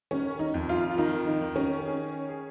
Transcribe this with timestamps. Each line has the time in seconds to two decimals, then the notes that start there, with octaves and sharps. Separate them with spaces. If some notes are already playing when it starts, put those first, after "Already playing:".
0.11 D#3 C#4
0.39 D#4
0.54 F2
0.69 F4
0.98 D#3 D#4
1.27 D#4
1.41 D#3
1.56 C#4
1.86 G#4
2.29 G#4